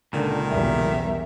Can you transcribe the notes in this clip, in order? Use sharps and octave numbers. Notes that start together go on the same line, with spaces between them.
C#2 A#2 D3 D#3
B1 E2 G3 E5